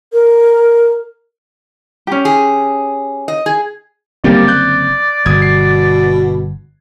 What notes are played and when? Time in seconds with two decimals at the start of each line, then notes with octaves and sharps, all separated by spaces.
0.13 A#4
2.07 C#4 G4
2.25 G#4
3.28 D#5
3.46 G#4
4.24 F#1 D3 G3 A#3 C4 G4 D5
4.48 F#6 G6
5.26 G1 B2 D#6 G#6
5.42 C7